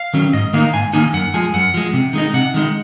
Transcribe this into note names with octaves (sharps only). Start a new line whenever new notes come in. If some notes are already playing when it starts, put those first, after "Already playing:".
Already playing: F5
D#3 F#3 C#4
G#2 D#5
D#3 A#3 D#4 F5
G#2 G#5
D#3 A#3 D#4 G#5
F#2 F#5
F3 G#3 G#5
F#2 F#5
F3 G#3
C3
D#3 G#3 D#4
C3 F#5
D#3 G#3 D#4